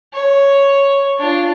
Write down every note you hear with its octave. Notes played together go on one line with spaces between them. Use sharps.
C#5
D4 F4